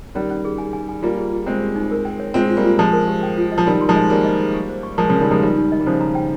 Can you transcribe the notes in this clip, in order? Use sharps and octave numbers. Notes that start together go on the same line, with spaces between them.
D#3 G3 C#4
C#4
G#4
G#5
G#5
G#5
G3 A#3 F4
G#4
F4
G#3 C4 C5
G4
D#4
A#4
G5
C#5
G#3 C4 F4
F4
G3 A#3
F4
F3 G#3 G4
A#4
G4
G5
F4
D#5
F3
D#3 G3 A#4
C6
F3 G#3
D#5
G3 A#3 G#4
D#5
G#4
C#6
C5
C#6
F3 G#3 A#4
C#3 F3
A#4
D#3 G3
F3 G#3 A#4
D#3 G3 G4
D#4
D#5
G3
C#3 F3 C5
A#5
G5